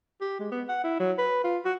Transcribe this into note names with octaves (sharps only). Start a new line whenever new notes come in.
G4
G#3
B3
F#5
E4
F#3
B4
F4
F#4